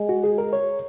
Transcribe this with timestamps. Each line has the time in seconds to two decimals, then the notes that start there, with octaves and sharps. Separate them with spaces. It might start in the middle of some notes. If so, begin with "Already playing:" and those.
Already playing: G#3
0.09 F#4
0.24 G#4
0.38 A#4
0.53 C#5